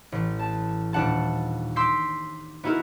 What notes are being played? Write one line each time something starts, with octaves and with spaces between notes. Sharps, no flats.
A1
A5
D#1 D4 F#5 A5
C6 D6 E6 G6 B6 C7
B3 D#4 E4 F#4 A#4